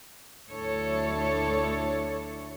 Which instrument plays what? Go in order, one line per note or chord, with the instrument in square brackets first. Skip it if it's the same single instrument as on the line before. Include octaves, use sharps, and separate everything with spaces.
[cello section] D2 D4 E4 A4 C#5